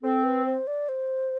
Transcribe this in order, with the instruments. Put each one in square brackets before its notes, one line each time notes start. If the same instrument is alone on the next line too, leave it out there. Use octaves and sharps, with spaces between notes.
[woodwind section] C4 [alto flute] A4
[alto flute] B4
C5
D5
C5